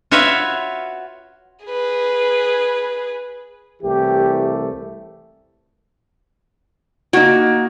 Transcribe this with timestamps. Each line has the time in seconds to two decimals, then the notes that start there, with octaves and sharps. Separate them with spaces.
0.11 F4 F#4 B4 C#5 E5 F5
1.65 G#4 B4
3.82 C2 E3 A3 G4
7.13 A#3 D#4 F#4